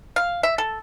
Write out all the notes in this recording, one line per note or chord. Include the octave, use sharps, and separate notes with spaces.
F5
E5
A4